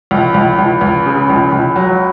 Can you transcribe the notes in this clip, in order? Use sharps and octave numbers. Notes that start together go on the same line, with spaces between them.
C#2
C#2
C#2
C#2
C#3
C#2
C#2
F#3